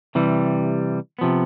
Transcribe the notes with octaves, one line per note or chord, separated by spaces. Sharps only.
C3 E3 G3
C3 F3 B3